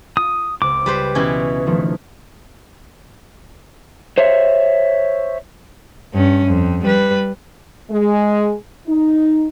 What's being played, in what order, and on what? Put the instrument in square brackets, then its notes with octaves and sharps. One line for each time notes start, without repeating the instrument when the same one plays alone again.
[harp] F4 [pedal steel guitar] D#6
[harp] C#2 C4 F#6 [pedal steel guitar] D6
[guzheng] G3 B4 C5
B2 E3 C#4
[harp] D#3 F3 A3
[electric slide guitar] C5 C#5 E5
[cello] G2 C#4
F2
G3 B4
[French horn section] G#3
D#4